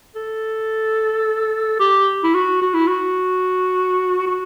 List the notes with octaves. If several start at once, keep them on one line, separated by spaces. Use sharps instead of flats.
A4
G4
E4
F#4
F#4
E4
F#4
F#4